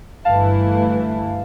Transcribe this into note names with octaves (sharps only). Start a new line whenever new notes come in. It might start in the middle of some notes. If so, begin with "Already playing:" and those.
G1 G2 E3 A3 E4 F5 A5